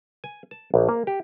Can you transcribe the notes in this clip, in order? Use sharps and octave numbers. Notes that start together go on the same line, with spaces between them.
G#5
A5
A#1
A#3
G4